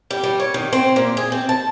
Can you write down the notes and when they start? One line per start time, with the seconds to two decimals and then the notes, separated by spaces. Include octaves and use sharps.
0.11 G3
0.23 G3
0.40 C#5
0.54 D#3
0.73 C4
0.96 A#2
1.17 G#4
1.32 C4
1.49 A5